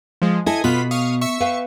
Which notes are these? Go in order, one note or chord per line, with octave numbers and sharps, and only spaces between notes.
F3 G#3
E4 A4 D#5 G#5
B2 B3 F4 B5
F5 C#6 D#6
E5 C#6
B4 F5 G5